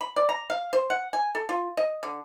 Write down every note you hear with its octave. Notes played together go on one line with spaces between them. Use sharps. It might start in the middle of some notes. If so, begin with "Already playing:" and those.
B5
D5
A#5
F5
C5
F#5
G#5
A4
F4
D#5
D3